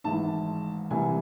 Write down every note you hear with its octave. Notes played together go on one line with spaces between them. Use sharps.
G#1 G#2 E3 A5
C2 C3 E3 G#5